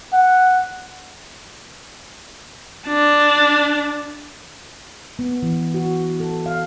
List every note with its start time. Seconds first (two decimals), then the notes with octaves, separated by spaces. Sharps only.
0.13 F#5
2.88 D4
5.19 B3
5.43 E3
5.74 F#4
6.20 A4
6.46 F5